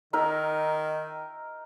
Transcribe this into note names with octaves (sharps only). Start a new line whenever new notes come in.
D#3 D#4 A#4 E5